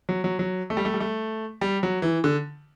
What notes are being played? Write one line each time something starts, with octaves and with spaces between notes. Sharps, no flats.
F#3
F#3
F#3
A3
G3
A3
G3
A3
G3
F#3
E3
D3